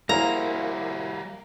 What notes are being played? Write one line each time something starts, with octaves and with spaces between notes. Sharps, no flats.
G3 A#3 E4 F#4 G#4 C5 A#5